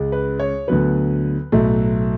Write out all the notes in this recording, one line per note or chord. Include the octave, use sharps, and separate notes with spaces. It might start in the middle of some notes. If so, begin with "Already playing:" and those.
Already playing: C#2 C#3 G#3
B4
C#5
D2 D3 F#3 B3 B4
B1 A2 F#3 A3